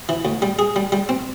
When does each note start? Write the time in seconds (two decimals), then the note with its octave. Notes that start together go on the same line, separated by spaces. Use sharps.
0.09 E3
0.25 D2
0.42 G3
0.59 G#4
0.76 G3
0.92 G3
1.09 C4